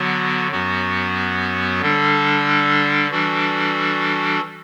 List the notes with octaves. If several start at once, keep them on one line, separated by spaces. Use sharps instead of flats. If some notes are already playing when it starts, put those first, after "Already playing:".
Already playing: D3 F#3 B3 F#4
F#2 F#3 B3 F#4
D3 G3 D4 A4
E3 G3 D4 F#4 A4